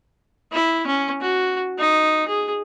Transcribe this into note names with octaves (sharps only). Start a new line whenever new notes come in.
E4
C#4
F#4
D#4
G#4